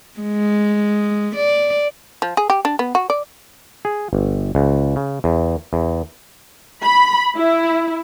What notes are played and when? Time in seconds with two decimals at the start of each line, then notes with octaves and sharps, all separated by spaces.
0.20 G#3
1.36 D5
2.22 F3
2.37 G#4
2.50 G4
2.65 D4
2.79 B3
2.95 F#4
3.10 D5
3.85 G#4
4.13 G1
4.55 C#2
4.96 C#3
5.24 E2
5.73 E2
6.83 B5
7.37 E4